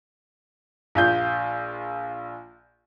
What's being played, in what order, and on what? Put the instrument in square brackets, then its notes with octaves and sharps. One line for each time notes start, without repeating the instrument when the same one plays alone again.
[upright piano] A#1 F4 G6